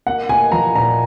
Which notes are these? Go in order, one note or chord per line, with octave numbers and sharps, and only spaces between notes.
A#3 F#5
A#3 G#5
F3 A#5
A#2 A#5